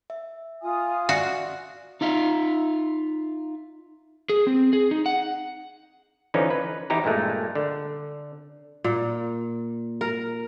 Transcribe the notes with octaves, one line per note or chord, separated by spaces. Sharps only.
E5
F4 G#5 D#6
F#4 D5 E5 F5
D#4 F4 E5
G#4
C4
G#4
D#4
F#5
D3 E3 F3 C#4 D#4
B4
E2 D#4 E4 G4 A#5
G2 A#2 G#3 A3
D3
A#2
A#4